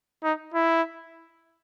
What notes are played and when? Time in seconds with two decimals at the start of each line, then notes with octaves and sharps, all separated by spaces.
0.23 D#4
0.54 E4